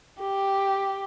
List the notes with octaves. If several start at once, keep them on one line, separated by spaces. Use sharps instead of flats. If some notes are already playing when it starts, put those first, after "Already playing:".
G4